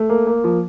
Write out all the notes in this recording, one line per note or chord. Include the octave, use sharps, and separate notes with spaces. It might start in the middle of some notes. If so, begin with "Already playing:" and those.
Already playing: A3
A#3
A#3
F3